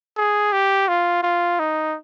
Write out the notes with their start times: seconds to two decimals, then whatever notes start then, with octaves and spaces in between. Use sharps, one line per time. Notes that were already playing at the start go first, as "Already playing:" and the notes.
0.17 G#4
0.53 G4
0.88 F4
1.23 F4
1.60 D#4